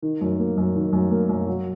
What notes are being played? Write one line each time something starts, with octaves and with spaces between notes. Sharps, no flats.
D#3
F#2
A#3
F#2
D#3
F#2
A#3
F#2
F#3